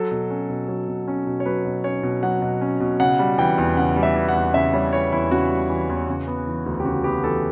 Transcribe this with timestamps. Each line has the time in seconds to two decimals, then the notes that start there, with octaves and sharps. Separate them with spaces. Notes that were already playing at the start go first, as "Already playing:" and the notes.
Already playing: F#3 A4
0.11 B2
0.30 C#4
0.49 B2
0.68 F#3
0.88 B2
1.08 C#4
1.27 B2
1.40 C#5
1.45 F#3 B4
1.65 B2
1.84 C#4 C#5
2.03 B2
2.23 F#3 F#5
2.42 B2
2.61 C#4
2.80 B2
3.00 C#3 F#5
3.19 G3
3.38 E3 G5
3.58 E2
3.77 C#3 F#5
3.96 G3
4.03 E5
4.16 E3
4.29 F#5
4.35 E2
4.54 C#3 E5
4.73 G3 C#5
4.92 E3 C#5
5.12 E2 E4
5.31 C#3 F#4
5.50 G3
5.70 E3
5.89 E2
6.08 C#3
6.27 B3
6.47 E3
6.66 D2
6.80 G4
6.85 C#3 F#4
7.04 B3 G4
7.24 E3 A4